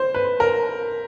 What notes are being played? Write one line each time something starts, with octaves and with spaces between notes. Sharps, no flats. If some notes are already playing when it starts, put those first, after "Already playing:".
Already playing: C5
B4
A#4